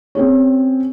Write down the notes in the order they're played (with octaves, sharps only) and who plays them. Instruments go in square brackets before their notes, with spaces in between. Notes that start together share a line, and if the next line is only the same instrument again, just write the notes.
[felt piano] C4 C#4 G#4 C#5